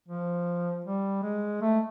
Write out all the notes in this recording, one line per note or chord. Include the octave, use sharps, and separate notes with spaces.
F3
G3
G#3
A3